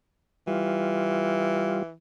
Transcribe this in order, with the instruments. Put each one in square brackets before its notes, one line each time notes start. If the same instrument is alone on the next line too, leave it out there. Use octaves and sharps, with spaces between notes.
[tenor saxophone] E3 [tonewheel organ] G3 F4